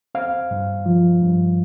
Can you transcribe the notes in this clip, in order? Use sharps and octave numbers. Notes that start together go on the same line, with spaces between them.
C4 F5
G2
F3
G2